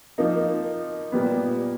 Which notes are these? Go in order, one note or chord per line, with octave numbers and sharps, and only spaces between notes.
F3 A#3 D#4
A#2 G3 B3